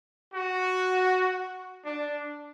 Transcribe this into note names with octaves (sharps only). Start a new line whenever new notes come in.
F#4
D4